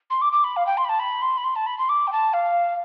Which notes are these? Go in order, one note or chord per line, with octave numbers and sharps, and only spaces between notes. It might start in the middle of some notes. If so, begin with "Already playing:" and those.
C6
D6
D6
B5
F5
G5
C6
B5
A5
B5
C6
B5
C6
A5
B5
C6
D6
G5
A5
F5